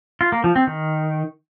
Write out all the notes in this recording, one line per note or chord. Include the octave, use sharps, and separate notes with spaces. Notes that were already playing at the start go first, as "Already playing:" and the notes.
F4
A#3
F3
C4
D#3